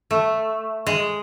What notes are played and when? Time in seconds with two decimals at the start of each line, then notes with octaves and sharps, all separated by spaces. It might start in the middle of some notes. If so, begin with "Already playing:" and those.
0.11 A3
0.87 G#3